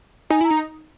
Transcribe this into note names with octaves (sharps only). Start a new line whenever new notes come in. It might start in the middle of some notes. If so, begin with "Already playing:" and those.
D#4 G#5
E4
A#5
D#4